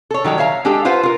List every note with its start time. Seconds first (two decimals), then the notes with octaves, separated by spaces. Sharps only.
0.11 A4 C#5
0.24 D#3 F#3 G3 G5
0.38 C#5 E5 F5 A5 A#5
0.65 G#3 D4 G4 A4 G5
0.85 F4 B4 C5 F5 F#5
1.03 F4 A#4